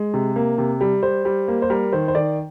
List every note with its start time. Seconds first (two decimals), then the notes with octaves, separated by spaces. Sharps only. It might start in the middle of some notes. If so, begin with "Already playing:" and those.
Already playing: G#3
0.14 C3
0.36 A#3
0.58 C3
0.81 G3
1.03 G3 C5
1.25 G3
1.48 A#3
1.62 C5
1.70 G3 A#4
1.92 D#3 C5
2.08 C5
2.15 D#3 D5